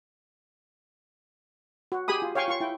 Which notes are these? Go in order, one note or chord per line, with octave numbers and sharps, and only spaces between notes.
F#4
G4 G#4 G#5 B5 D#6
F4
C#5 F5 G5 G#5 C#6
F4 C#6
E4 G5